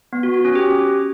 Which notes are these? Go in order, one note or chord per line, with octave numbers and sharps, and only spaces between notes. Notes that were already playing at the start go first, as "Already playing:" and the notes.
B3
F#4
F#4
C#4
G4